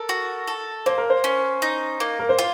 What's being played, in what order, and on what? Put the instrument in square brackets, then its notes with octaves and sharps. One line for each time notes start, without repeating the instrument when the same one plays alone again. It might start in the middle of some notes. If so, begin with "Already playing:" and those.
Already playing: [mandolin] A4 [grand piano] A#4
[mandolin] F#4
A4
[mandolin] A#3 [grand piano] C5
[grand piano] A#4
C5
[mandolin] C#4
D#4
A#3
[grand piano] A#4
C5
[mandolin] F4